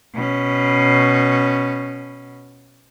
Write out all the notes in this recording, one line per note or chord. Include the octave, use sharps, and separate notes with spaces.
B2 C#4